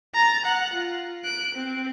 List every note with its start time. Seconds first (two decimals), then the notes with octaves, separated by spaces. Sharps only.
0.15 A#5 A6
0.45 F#5 F#6
0.74 F4
1.24 F#6 D7
1.55 C4